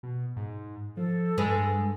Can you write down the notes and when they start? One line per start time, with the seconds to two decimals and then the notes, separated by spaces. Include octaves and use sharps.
0.03 B2
0.37 G#2
0.97 F3 A4
1.38 G2 G#3 B4